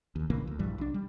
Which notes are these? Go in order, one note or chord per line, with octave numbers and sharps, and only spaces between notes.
D#2
A#1 C#3 E3 A#3
D2
A#1 G2 E3 G3
B1 D4
G3